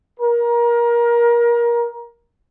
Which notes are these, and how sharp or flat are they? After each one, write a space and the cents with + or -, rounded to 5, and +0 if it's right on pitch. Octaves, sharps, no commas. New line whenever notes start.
A#4 +25